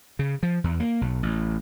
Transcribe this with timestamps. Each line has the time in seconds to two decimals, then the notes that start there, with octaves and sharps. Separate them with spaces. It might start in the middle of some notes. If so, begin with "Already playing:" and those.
0.19 C#3
0.43 F3
0.64 E2
0.80 A#3
1.01 B1
1.23 A1